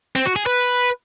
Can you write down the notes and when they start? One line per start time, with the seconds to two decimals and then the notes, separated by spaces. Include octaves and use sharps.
0.16 C4
0.26 F#4
0.36 G#4
0.46 B4